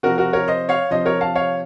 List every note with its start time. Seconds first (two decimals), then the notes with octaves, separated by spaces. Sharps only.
0.03 C3 F3 F#4 A#4
0.18 F#4 A#4
0.33 A#4 C#5
0.48 C5 D#5
0.69 C#5 F5
0.91 C3 F3 C5 D#5
1.06 A#4 C#5
1.21 F5 A5
1.35 C#5 F5